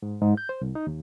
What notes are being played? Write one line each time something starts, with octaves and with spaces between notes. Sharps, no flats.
G#2
G#2
G6
C5
C2
D#4
D#2